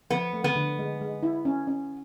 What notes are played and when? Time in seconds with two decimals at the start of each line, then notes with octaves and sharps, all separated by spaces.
0.10 F3 B3
0.33 A3
0.44 B3
0.56 D3
0.79 G#3
1.01 G#3
1.23 E4
1.45 C#4
1.67 C#4